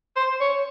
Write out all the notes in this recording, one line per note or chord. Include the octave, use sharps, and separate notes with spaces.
C5
C#5